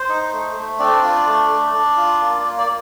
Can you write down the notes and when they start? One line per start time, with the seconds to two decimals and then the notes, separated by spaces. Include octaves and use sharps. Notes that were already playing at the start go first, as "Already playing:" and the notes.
Already playing: C5
0.09 D#4
0.32 A3
0.55 A3
0.79 C4 D4 D5
1.03 F4
1.26 A3
1.50 A3
1.74 D4
1.96 F4
2.21 A#3
2.44 A#3
2.58 D5